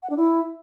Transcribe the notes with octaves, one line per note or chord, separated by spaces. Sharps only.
F#5
D4
E4